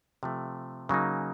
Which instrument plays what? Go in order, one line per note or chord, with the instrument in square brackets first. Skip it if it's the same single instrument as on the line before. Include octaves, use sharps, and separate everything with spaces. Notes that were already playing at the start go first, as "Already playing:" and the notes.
[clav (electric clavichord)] C3 F3 A3
C#3 F#3 A#3 D#4